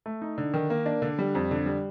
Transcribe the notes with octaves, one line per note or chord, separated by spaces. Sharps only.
A3
D#4
D3
D#3
A#3
D4
D3
G3
F2
D3
G3